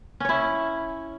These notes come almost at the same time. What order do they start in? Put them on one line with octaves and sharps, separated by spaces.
C#4 C#5 E4